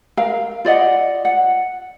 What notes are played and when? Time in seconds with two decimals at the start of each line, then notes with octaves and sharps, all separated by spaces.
0.17 A#4 F5
0.65 F4 D5 D#5 F#5
1.25 F#5